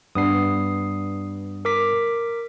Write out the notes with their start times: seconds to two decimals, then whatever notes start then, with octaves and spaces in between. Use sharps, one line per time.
0.15 G2 B3 D4 D#6 C7
1.65 A#4 D6 B6